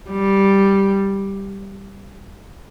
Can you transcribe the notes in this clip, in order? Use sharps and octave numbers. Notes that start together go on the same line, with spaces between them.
G3